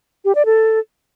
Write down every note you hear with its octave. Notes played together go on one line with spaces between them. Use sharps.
G4
D5
A4